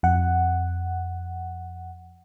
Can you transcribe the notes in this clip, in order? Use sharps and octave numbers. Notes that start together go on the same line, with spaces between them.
F2 F#5